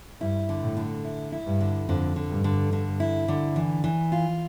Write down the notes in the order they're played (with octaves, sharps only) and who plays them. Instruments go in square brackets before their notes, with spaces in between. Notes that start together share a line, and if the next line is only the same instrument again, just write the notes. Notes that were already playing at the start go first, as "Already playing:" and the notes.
[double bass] G2 [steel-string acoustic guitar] E4
[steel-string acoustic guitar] D3
[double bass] A2
[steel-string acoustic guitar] D3
E4
E4
[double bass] G2
[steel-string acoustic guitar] D3
[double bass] F2 [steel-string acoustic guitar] D3
[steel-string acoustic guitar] D3
[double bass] G2
[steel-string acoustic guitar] D3
D3
E4
D3
E3
E3
F4